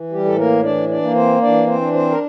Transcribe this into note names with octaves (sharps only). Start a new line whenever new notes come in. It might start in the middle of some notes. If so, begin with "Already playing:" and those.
Already playing: E3
G3 G4
A2 A4
A#3 A#4
E3 D4 D5
D4 D5
A#3
C4 C5
E3 D4 D5
C4 C5
D4
C4 C5
A#4